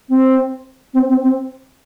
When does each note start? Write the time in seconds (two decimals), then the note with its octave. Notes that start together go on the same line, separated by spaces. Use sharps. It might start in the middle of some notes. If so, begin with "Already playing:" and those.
0.09 C4
0.94 C4
1.09 C4
1.22 C4